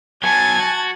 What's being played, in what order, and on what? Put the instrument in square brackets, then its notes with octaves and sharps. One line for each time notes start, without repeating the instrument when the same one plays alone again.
[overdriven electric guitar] F#3 B3 [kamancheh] G#5 [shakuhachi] A5 [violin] G#6 A6
[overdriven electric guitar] F#4